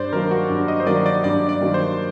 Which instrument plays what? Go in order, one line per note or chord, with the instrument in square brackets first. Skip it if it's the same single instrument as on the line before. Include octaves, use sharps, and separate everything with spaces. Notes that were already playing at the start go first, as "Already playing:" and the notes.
Already playing: [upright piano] G2 [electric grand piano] C5 D5
[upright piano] D#3 F#3 A#3 [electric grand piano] A#4
[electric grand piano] F#4
[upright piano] G2
[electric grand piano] D#5
C5
[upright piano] D#3 F#3 A#3 [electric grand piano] D5
[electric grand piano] D5
[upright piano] G2 [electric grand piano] D5
[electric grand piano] D5
[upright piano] D#3 F#3 A#3
[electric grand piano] C5